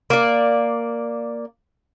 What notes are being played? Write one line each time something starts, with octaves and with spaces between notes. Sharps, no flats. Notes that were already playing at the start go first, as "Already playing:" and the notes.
A#3 D5